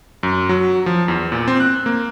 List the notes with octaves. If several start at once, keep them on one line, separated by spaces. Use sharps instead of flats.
F#2
F#3
F3
E2
A#2
C4
F#6
A#3